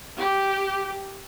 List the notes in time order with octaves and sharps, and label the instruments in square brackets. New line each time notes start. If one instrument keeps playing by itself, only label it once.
[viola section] G4